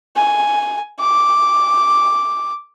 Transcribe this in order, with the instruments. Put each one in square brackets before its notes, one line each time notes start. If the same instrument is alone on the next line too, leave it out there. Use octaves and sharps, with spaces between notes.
[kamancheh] G#5
D6